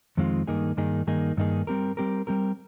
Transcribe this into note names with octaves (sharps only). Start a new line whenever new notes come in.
F2 D#3 G#3 C4 F4
G2 D#3 A#3 D#4 G#4
G2 D#3 A#3 D#4 G#4
G2 D#3 A#3 D#4 G#4
G2 D#3 A#3 D#4 G#4
G3 C4 G4 A#4
G3 C4 G4 A#4
G3 C4 G4 A#4